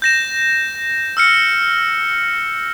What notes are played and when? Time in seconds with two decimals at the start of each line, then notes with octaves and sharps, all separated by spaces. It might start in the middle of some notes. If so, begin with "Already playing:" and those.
0.02 G6 A#6 E7
1.17 E6 F6 C#7